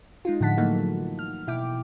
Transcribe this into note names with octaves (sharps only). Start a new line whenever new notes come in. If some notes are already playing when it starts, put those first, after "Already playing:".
G#3 D#4 F4
A2 D3 F3 F#5 A5 B6
E3 F#3 A3 A#3 D#4
F6
B2 E4 G5 D6